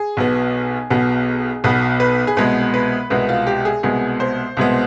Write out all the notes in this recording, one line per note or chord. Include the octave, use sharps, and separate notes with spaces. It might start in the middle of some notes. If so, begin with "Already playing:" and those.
Already playing: G#4
B1 B2 B3
B1 B2 B3
B1 B2 B3 B4
B4
G#4
C2 B2 G#3 B3 B4
B4
C2 B2 G#3 B3 B4
F4
G4
G#4
C2 B2 G#3 B3 G#4
C5
C2 B2 G#3 B3